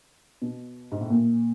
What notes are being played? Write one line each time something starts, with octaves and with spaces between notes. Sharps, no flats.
B2
G#2
A2
A#2